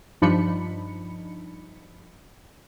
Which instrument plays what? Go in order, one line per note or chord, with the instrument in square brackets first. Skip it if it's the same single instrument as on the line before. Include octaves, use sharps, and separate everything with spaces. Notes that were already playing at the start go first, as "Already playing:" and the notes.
[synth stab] G2 F3 D4 D#4 B5 C#7